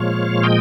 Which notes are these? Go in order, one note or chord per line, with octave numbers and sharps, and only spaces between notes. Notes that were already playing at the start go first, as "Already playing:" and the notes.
Already playing: A#2 F3 G#3 C#5 F5
D#5 G5